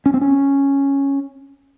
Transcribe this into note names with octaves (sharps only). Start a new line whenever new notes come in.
C#4
C4
C#4